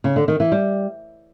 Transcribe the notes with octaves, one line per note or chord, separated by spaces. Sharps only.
C#3
D3
D#3
E3
G3